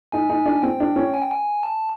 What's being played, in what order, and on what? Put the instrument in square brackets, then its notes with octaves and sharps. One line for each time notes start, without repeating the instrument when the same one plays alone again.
[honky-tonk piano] D#4 [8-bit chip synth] G#5
[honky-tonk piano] D#4
D4
[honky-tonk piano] C4 [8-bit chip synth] G5
[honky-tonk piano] D4
C#4
[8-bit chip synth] G#5
G5
G#5
A5